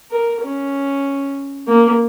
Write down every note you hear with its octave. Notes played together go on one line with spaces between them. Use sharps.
A#4
C#4
A#3